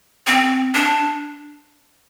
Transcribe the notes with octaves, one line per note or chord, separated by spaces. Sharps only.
C4
D4